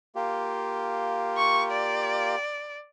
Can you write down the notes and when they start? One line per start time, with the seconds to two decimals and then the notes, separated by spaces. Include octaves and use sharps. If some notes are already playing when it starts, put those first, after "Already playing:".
0.16 A#3 F4 G4
1.37 C#6
1.72 D5